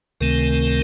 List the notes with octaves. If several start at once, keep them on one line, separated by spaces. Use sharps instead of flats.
C#2 C3 D#3 A3 C4 A#4